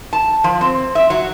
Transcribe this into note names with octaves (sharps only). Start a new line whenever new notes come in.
A5
F3
C4
E5
F#3